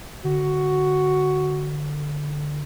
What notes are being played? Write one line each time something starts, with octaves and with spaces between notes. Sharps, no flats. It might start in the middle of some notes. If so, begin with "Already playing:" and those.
D3 F#4